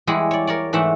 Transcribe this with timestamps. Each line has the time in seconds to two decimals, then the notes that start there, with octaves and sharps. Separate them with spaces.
0.07 E2 G3 G#3 E4 G#4 F#5
0.31 C#5 D5
0.47 A#4 C#5 D5
0.73 G#2 E3 A3 E5 F#5